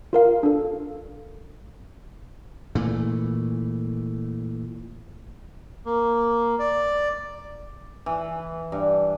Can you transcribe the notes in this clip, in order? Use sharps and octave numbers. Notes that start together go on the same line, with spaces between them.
F4 A#4 F5
D4 A4
A#2 E3 A3
A#3
D5
E3
G2